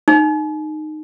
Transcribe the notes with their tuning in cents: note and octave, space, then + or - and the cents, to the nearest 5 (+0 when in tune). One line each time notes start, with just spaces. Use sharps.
D#4 -15